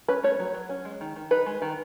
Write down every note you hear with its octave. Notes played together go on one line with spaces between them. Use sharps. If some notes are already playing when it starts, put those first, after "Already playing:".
C#4 B4
A3 C#5
F#3
F#3
C#4
G#3
D#3
D#3
D#4 B4
G#3
D#3